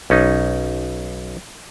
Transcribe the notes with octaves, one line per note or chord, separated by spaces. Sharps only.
B1 C#4 D#4